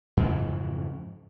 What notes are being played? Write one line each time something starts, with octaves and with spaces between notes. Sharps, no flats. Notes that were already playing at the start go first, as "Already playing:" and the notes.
F2 G#2 C#3 E3